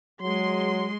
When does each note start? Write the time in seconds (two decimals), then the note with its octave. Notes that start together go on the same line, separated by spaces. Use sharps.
0.21 F#3 G#3 C6